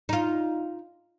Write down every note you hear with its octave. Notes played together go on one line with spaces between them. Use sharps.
D#4 F4